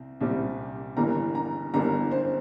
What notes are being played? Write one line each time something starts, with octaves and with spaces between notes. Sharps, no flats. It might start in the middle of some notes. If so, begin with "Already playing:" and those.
Already playing: C2 C4
C2 A#2 G3 C4
G1 G2 E3 G3 A#3 A#5
A#5
G1 G2 E3 G3 A#3 A#5
C5